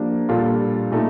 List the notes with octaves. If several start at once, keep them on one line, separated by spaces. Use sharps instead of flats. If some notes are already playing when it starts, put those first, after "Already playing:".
Already playing: F3 A#3 D4 G4
A#2 G3 D4 F4 A4
A#2 A3 D#4 A4